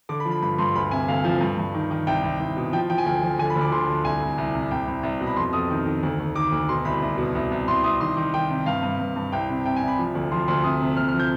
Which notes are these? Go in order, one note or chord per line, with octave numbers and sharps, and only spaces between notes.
D3 D6
B5
F3
B5
G2 B5
G2 C6
D2 B5
C3 G#5
D2 F5
F3
G2
G2
D#3
D#3
C2 G5
C2
C2
B2
F3 G5
F3 G5
G#5
D2 G5
F3
D3 G#5
B5
D2
D6
D3 C6
D2
C2 G#5
C2
C2
C3
C2 G5
C2
C2
B2
B5
F2 C6
F2 D#6
D#3
D#3
D2
D2
D#3 D6
D2
B2 C6
C2 B5
C2
B2
C2
C2
C2 C6
C2 D#6
D#3 C6
D#3
D#3 G5
C3
G2 F5
G2
G2
G2
C2 G5
C3
C3 G5
G#5
C2
B5
F3
D2
F3 C6
D2 C6
C3 D#6
C3
D2 F6
F6
F3
G6